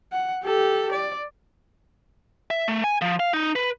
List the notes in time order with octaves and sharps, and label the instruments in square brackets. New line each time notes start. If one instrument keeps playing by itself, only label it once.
[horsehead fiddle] F#5
G4 A4
D5
[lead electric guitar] E5
A3
G#5
F3
F5
D#4
B4